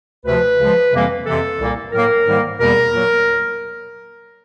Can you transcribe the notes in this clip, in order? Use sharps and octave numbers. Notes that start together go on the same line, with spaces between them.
D2 C3 F3 B4
C#2 C#3 F3 G#3
F2 C3 E3 G3 A#3
F2 C3 E3 A4
C2 A#2 G3 A#3
A2 F#3 A#3 A#4
G#2 D#3 G3 A#3
E2 B2 G3 A#3 A#4
A#2 F#3 A#3